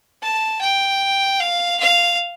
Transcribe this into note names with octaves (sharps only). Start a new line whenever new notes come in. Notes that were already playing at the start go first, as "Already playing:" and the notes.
A5
G5
F5
F5